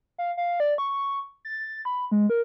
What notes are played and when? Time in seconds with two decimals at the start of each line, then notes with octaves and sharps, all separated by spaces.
0.18 F5
0.37 F5
0.60 D5
0.78 C#6
1.45 A6
1.85 B5
2.11 G#3
2.30 A#4